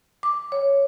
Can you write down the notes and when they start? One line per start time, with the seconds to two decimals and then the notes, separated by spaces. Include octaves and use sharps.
0.23 D6
0.52 C#5